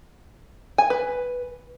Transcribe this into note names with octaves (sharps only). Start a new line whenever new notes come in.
G#5
B4